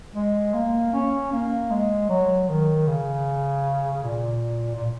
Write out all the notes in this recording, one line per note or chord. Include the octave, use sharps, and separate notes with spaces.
G#3
A#3
C#4
A#3
G#3
F#3
D#3
C#3
A#2
A#2